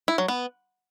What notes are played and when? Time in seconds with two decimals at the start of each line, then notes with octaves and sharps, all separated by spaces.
0.08 E4
0.18 F#3
0.28 B3